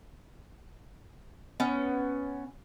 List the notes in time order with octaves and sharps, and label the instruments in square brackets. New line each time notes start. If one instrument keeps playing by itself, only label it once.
[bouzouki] B3 C#4